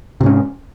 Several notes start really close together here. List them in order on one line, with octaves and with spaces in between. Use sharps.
C3 G#2 C#4